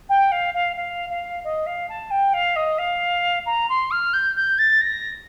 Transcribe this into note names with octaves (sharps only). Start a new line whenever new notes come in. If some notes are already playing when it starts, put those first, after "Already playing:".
G5
F5
F5
F5
F5
D#5
F5
A5
G5
F5
D#5
F5
A#5
C6
F6
G6
G6
A6
A#6